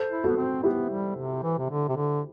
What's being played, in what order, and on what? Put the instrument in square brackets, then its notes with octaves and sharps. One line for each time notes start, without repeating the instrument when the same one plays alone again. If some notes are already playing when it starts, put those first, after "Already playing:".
Already playing: [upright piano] A4 C5
[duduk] E4
[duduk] B3 [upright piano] F#4 A4
[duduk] C4
[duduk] B3 [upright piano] E4 G4
[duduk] G3
C3
E3
C3
D3
C3
D3